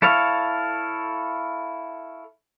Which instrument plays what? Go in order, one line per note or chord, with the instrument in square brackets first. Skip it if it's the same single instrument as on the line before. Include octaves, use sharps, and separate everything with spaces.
[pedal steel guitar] E4 A4 C#5 F5